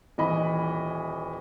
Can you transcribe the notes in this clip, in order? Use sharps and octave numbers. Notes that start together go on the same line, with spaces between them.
D#1 E3 D#5 G#5 B5